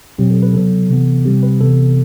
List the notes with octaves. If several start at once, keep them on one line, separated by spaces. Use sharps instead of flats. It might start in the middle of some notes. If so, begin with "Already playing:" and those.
B2 F#3 C4 G4
A4
B4
C3 F#3 B3 A4
C3 E3 B3
C3 G3 C4 G4
B4
C3 E3 B3 A4